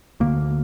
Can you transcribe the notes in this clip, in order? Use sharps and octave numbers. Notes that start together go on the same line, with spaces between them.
D2 D3 A#3